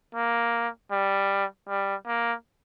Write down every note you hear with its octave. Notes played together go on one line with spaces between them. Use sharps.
A#3
G3
G3
A#3